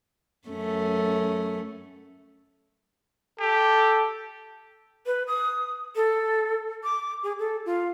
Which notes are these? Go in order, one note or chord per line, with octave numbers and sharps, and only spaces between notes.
F#2 A3 C#4
G4 A4
B4
D#6
A4
D6
G#4
A4
F4